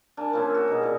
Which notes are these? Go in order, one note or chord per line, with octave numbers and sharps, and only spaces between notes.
D4 A#4 G#5 A5
F3 A#3 C#4 E5
F#4 E5
B2 D#4 G#4
A#2 G#4 D5 E5